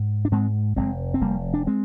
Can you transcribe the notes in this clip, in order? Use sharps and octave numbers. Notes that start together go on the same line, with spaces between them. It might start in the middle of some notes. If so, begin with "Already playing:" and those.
Already playing: G#2
D4
G#2 G#3 C4
F1 G#3 C4
C4
F1 G3 A#3
D4
G#3 C4